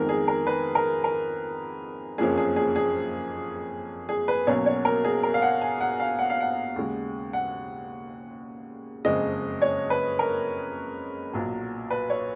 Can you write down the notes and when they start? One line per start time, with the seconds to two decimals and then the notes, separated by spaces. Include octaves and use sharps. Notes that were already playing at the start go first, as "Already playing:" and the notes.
Already playing: F2 D#3 G#3 B3 A#4
0.09 G#4
0.28 A#4
0.47 B4
0.75 A#4
1.04 A#4
2.18 F#1 F2 F3 A#3 C#4 G#4
2.38 G#4
2.56 G#4
2.76 G#4
4.09 G#4
4.28 B4
4.47 B1 B2 F#3 A#3 C#4 C#5
4.66 C#5
4.85 A#4
5.05 G#4
5.23 A#4
5.34 F5
5.42 F#5
5.62 G#5
5.81 F#5
6.00 F5
6.19 F#5
6.30 F5
6.41 F#5
6.76 D#2 C#3 G#3
7.33 F#5
9.05 F#1 F2 C#3 G#3 D#5
9.62 C#5
9.90 B4
10.19 A#4
11.33 B1 A#2 F#3
11.91 B4
12.10 C#5